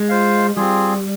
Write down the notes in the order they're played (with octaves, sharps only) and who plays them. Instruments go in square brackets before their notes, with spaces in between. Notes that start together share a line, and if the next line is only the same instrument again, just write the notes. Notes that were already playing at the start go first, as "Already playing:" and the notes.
Already playing: [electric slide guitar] G#3
[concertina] F4 C5 F5
[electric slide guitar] G3 [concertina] C4 F4 G#4